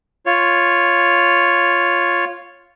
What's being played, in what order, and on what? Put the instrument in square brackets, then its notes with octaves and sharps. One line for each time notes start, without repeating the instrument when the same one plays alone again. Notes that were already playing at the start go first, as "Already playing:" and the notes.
[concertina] F4 C#5